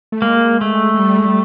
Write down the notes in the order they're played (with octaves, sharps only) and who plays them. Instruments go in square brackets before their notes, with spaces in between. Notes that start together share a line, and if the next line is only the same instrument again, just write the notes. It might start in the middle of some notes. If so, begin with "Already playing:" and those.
[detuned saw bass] A3
[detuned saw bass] G#3 [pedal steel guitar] A#3
[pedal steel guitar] A3
[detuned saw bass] G#3
G3
G#3
G3